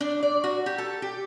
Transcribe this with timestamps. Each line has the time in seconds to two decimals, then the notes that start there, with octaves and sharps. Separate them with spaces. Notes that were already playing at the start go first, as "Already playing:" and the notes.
0.01 D4
0.23 D5
0.44 F#4
0.66 G4
0.78 A4
1.02 G4